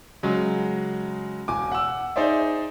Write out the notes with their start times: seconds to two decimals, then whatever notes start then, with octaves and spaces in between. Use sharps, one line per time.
0.23 C#3 F#3 G#3
1.48 E1 G#5 D6
1.72 F#5 E6
2.16 D#4 G#4 C5 D5 E5